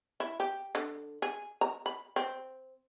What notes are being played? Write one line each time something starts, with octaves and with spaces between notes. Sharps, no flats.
E4
G4
D3
G#4
A#5
B5
C4